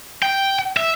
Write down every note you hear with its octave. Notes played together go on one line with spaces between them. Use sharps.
G5
E5